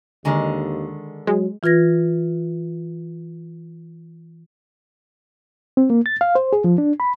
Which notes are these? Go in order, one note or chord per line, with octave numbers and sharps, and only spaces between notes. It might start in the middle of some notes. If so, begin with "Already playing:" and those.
D#2 D3 D#3 G#3
F#3 G#3
E3 F4 B4 G#6 A#6
C4
A#3
A6
F5
C5
G#4
F3
D4
B5